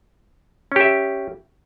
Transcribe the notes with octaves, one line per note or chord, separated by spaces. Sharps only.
C#4 G4 E5